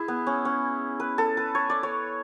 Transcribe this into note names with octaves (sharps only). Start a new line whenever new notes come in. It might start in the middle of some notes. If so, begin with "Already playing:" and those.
Already playing: E4 G#4
B3
C#4
C#4
B4
A4
B4
C#5
D5
C#5